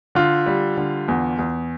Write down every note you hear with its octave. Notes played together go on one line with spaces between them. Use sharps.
D3 F4
G3
D3
E2
E2